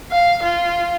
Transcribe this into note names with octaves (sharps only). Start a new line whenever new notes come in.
F5
F4